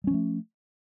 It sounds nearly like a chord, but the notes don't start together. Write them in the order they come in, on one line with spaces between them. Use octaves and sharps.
G3 C#4 F3 A3